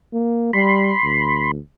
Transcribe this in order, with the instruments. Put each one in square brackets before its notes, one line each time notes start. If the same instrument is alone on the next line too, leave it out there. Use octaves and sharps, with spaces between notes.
[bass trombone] A#3
[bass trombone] G3 [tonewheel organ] B5 C6
[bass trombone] D2